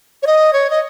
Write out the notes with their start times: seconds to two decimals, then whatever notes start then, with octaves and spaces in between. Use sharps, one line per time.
0.22 C#5
0.27 D#5
0.53 C#5
0.70 D#5